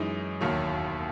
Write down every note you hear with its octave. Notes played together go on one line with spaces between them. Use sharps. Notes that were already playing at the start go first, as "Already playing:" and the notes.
Already playing: F#2 E3 G#3 D#4
E1 D#2 D#3 F#3